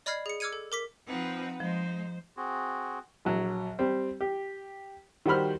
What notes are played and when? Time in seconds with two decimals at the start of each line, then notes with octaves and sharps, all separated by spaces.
0.06 D5 D#5 B5 F6 G#6 C7
0.26 G#4 C#7
0.40 D6 E6 F6 G#6 C#7 D#7
0.53 A4
0.72 A#4 D6 B6
1.07 F3 C4 D#4 B4 F#5
1.60 F3 G#3 D#4 C5
2.37 C4 F#4 G#4
3.25 A#1 F#3
3.79 G3 C4
4.21 G4
5.26 D#3 G3 F#4 C5 B5 F6